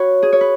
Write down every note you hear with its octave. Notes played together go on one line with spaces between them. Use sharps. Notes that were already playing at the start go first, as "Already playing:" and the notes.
Already playing: F#4 B4 C#5
G#4
C#5
B4